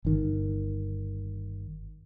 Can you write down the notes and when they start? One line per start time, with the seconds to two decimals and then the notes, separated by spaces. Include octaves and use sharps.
0.05 G1 D#3